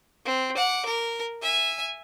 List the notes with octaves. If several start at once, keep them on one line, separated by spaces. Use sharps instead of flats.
C4
F#5 D6
A#4
E5 G#5